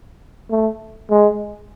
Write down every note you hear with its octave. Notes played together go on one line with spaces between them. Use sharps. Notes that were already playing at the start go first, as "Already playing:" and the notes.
A3
G#3